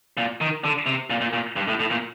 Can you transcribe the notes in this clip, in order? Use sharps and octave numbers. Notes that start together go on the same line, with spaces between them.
A#2
D#3
D3
C3
A#2
A#2
A#2
G2
A2
A2
A#2